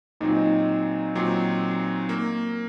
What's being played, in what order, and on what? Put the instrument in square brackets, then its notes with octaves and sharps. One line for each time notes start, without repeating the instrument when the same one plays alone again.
[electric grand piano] A#2 F#3 C4 [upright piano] D#4
[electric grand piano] A#2 F#3 C4
A#3